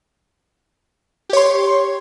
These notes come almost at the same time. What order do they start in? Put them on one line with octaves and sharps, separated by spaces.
G4 C#5 C6